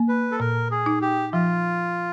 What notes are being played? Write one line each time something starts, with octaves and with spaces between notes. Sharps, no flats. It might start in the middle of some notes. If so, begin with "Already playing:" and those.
Already playing: A#3
B4
A4
A#2 A#4
G#4
D#4
G4
F3 F4